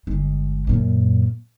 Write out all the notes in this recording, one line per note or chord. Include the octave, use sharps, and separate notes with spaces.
G1 G#3
F#2 A#2